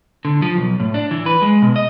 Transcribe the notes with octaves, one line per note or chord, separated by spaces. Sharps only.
D3
F3
B1
A2
D4
E3
B4
G#3
B2
D#5